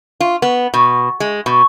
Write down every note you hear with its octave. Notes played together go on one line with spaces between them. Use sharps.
F4
B3
B2
G#3
B2